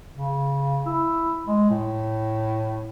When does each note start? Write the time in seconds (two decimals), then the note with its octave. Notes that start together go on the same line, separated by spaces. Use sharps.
0.17 C#3
0.86 E4
1.47 G#3
1.70 A2